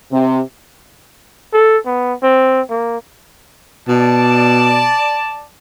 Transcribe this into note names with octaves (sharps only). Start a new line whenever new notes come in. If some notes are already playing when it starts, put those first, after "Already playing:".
C3
A4
B3
C4
A#3
B2 D5 A5